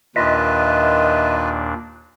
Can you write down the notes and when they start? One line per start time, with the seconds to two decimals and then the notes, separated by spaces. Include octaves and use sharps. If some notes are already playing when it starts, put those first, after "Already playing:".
0.16 D#2 A#2 D#3 D4 F4 B4 D#5 E5